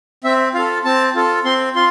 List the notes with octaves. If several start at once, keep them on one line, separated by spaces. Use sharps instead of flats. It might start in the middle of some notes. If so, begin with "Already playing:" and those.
C4 E5
F4 A4 F5
C4 A5
F4 A4
C4 C6
F4 C6